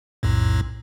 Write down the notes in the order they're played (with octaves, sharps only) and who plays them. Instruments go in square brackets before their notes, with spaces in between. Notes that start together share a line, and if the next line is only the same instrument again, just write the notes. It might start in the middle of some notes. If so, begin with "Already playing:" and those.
[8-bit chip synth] B1 F2 A2